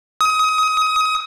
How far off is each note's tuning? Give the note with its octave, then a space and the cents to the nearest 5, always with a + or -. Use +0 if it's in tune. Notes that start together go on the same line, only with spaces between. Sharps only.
D#6 +25